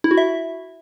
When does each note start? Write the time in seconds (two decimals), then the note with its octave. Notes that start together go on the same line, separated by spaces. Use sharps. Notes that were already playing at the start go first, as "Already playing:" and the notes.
0.04 E4
0.11 F#4
0.17 E5